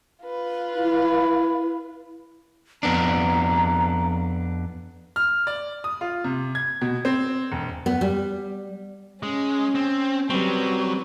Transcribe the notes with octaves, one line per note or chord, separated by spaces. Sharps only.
F4 B4
E4
F2 B3 D4 A#5
F6
D5
D#6
F4
C3
G#6
B2
C4
E1
B3
G3
G#3 C#4
C4
F#3 G3 C4 B4